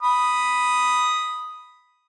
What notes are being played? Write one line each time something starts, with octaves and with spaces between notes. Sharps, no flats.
B5 D#6